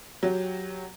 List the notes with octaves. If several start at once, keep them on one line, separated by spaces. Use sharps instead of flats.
F#3 G4